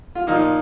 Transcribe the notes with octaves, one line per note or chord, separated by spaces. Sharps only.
F4
A#2 F3 A#3 D#4